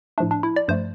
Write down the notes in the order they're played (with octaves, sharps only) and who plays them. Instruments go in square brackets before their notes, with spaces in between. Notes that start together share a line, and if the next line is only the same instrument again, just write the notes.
[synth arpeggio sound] A2 F3 A3 D4
D4
E4
D5
G2 F3 A3 C5